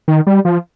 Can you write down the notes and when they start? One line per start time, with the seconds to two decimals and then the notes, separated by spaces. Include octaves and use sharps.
0.08 D#3
0.27 G3
0.45 F3